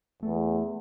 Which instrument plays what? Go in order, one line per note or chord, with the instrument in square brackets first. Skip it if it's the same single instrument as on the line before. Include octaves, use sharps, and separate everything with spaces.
[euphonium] E2 [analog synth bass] A3